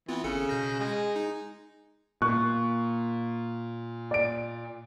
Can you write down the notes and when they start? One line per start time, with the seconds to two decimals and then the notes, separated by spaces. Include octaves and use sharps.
0.08 E3 B3 C4 F4
0.24 G#1 C#3 A4 C#7
0.49 B2 G6 A#6
0.79 G#3
1.16 D#4
2.22 A#2 C#6 F#6
4.11 D5 D7